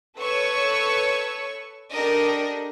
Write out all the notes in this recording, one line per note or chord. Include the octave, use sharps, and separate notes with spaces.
A4 B4 C#5 C#6 E6
D4 G4 A4 A#4 D#5